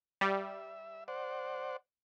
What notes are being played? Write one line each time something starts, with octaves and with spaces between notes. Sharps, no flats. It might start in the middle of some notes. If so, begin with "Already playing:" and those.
G3 E5
C5 D5 F#5